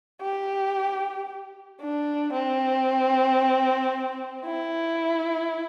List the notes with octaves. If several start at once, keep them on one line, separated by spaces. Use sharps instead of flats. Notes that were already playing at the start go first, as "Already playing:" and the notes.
G4
D4
C4
E4